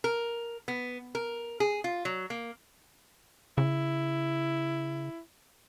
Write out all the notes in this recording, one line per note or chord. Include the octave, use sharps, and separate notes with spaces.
A#4
B3
A#4
G#4
F4
F#3
A#3
C#3 E4